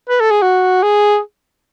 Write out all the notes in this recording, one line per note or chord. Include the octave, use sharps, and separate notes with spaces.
B4
A4
G#4
F#4
G#4